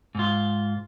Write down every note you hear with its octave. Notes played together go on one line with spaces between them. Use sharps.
G#2 F4